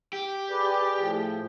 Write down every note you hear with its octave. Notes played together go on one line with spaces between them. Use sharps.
G4
G#4 B4 D5
A2 F3